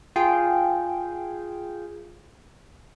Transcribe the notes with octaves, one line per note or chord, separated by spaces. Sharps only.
F4 G#4 G5